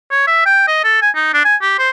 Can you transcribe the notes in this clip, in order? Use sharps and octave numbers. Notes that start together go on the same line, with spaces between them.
C#5
E5
G5
D#5
A4
G#5
D#4
D4
G#5
G4
C5